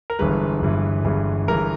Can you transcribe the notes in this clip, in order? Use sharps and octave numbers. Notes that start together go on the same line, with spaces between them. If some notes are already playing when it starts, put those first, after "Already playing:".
A#4
G1 G2 E3 G#3 B4
G1 G2 E3 G#3
G1 G2 E3 G#3
G1 G2 E3 G#3 A#4